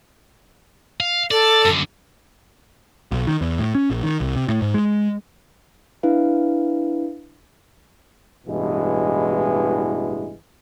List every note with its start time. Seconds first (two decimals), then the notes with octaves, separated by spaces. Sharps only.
1.00 F5
1.31 A4 D5
1.65 F#2 D3
3.11 B1
3.27 D#3
3.41 E2
3.59 A2
3.75 C#4
3.90 A#1
4.03 D#3
4.20 C2
4.36 C3
4.49 A2
4.62 G#2
4.74 G#3
6.03 D4 E4 B4 F5
8.47 A1 G2 B2 E3 G#3